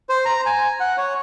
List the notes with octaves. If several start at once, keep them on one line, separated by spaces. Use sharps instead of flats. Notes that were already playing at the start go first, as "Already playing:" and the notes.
C5
A#5
G#5
F#5
C#5